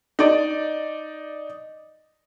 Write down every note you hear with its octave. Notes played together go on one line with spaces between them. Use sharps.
D#4 D5